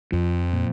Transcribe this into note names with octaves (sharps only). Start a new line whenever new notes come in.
F2 F3
A#2